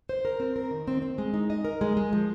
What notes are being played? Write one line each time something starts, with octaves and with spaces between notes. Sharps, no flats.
C5
A#4
C4
A#4
D#3
C4
C4
G#3
D#4
D#5
A#4
G#3
G#3
F3